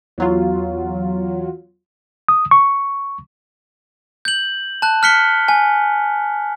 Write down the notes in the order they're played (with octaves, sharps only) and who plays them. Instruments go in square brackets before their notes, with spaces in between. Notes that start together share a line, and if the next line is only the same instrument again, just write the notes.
[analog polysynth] E2 F#3 F4
[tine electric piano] D#6
C#6
[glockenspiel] G6 F#7
A5 F#6
F6 F#6 B6 C#7 G7
G#5